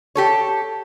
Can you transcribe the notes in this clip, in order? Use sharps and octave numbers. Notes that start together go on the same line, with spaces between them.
G4 A4 C#5